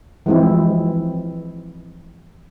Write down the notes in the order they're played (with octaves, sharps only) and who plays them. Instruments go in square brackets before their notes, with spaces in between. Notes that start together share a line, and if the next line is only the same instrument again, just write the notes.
[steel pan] E3 F3 G#3 C4 E4